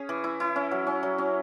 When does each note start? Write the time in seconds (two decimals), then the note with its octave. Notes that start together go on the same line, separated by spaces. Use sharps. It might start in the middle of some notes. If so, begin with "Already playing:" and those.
Already playing: C#4 G#4
0.09 E3
0.24 E4
0.40 E4
0.56 C#4
0.71 F#3
0.87 C#4
1.03 F#3
1.18 C#4